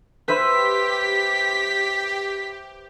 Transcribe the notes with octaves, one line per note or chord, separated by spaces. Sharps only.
G4 B4 C5 E5 B6